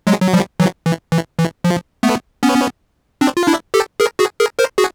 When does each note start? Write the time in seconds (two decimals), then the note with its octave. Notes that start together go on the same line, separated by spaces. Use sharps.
0.07 F#3 G#3
0.21 F#3
0.33 F3 G3
0.60 E3 F#3
0.86 E3
1.12 E3
1.39 E3
1.64 F3
2.03 A3 B3
2.43 B3 C#4
3.21 C4 D4
3.37 F4
3.47 D4 E4
3.74 G4 A4
4.00 G#4 A#4
4.19 F#4 G#4
4.40 G#4 A#4
4.58 A#4 C5
4.78 F#4 G#4